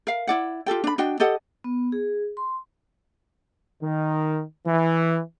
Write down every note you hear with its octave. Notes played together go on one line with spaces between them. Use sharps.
A#4 F5
E4 D5 F#5
F4 G4 A4 G5
D4 B5
D4 F#4 D#5 G5
G4 A4 D#5 F#5
B3
G#4
C6
D#3
E3